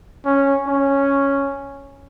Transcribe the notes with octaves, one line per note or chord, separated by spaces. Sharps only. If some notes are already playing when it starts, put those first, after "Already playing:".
C#4
C#4